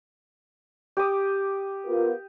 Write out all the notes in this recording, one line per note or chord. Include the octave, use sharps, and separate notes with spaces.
G4 D6 D#6
B3 F4 A#4